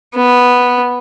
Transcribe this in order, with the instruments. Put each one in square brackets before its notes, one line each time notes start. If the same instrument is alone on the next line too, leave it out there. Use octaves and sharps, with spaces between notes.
[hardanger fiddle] B3